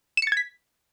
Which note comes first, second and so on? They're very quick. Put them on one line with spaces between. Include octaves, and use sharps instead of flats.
E7 C#7 A6 G#6 B6